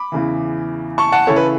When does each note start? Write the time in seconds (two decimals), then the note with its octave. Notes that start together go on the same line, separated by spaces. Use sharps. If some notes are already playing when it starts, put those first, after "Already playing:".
Already playing: B5 D6
0.12 E2 C#3 E3
0.98 A5 C#6
1.12 F#5 A5
1.27 C#3 E3 A3 C#4 E4 A4 C#5
1.36 B4